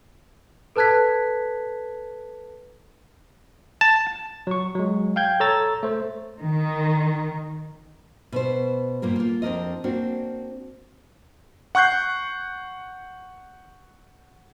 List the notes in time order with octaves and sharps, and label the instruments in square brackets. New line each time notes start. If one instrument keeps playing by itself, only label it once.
[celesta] A4 B4 A5 F#6 G#6 B6
[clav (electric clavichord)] A5
[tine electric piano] F#3 C#6
F#3 G#3
F5 G5 G6 G#6
A4 C#5 A#5 E6 A6
A3 C5
[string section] D#3
[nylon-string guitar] B2 B4 C5
G2 A#2 A#3 A#4
A#3 F4
F2 C4 D4 A#4 D#5
A#3 C4 D4 F#4
[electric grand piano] F#5 C#6 F#6 G6 C7